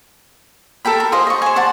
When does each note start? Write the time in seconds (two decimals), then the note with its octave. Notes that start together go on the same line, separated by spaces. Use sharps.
0.85 A4 A#4 G5 B5
1.00 A#4
1.12 F4 G#4 C5 D#5
1.27 D#5 C#6
1.42 C5 G#5
1.56 C5 D5 F#5 A5